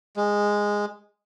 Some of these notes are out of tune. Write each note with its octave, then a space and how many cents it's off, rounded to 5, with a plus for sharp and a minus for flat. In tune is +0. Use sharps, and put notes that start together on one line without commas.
G#3 -10